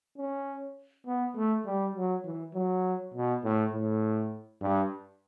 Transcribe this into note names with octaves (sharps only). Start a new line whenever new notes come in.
C#4
B3
A3
G3
F#3
E3
F#3
B2
A2
A2
G2